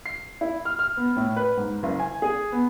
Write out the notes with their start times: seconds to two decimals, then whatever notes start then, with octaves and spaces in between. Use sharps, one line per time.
0.06 C7
0.41 E4
0.65 F6
0.79 F6
0.97 B3
1.16 A2
1.36 B4
1.57 G#2
1.83 F#1
2.00 G#5
2.22 G#4
2.52 B3